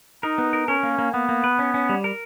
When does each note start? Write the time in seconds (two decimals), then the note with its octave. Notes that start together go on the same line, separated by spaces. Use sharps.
0.23 D#4 A#4
0.38 B3
0.53 A#4
0.68 C#4 A#4
0.83 A#3
0.98 A#3
1.13 A#3 B3
1.29 A#3
1.44 B4
1.59 C#4
1.74 C#4
1.89 G3
2.04 A#4